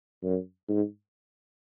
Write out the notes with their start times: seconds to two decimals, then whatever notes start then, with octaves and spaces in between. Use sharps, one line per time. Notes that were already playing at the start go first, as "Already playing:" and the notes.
0.24 F#2
0.68 G#2